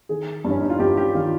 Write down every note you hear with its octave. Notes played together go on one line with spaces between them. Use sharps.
D#3 G#4
G2
C#4
D#4
F4
G2 G4
G4
D#3 F4